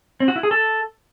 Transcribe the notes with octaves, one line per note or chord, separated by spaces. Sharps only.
C4
F#4
E4
G#4
A4